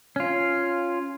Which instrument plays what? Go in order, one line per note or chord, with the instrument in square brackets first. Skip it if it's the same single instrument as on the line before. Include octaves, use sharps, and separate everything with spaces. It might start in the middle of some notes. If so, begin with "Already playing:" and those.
[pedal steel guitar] C#4 F4